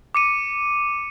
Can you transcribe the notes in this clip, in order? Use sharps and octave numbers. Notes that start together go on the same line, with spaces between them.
D6 C#7 D#7